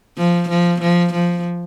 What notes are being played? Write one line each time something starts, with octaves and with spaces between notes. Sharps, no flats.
F3
F3
F3
F3